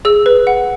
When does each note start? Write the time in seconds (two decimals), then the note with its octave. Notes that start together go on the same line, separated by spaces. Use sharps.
0.05 G#4 E6
0.26 B4
0.47 F#5